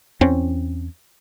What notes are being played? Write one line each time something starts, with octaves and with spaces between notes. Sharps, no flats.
E2 C4 C#4